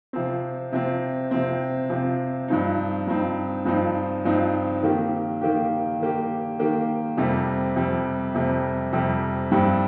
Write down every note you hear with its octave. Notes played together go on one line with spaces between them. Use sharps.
C3 F3 C4
C3 F3 C4
C3 F3 C4
C3 F3 C4
G2 F3 C4 D#4
G2 F3 C4 D#4
G2 F3 C4 D#4
G2 F3 C4 D#4
D#3 A#3 G4
D#3 A#3 G4
D#3 A#3 G4
D#3 A#3 G4
F2 C3 G3 C4
F2 C3 G3 C4
F2 C3 G3 C4
F2 C3 G3 C4
G2 G3 C4 G4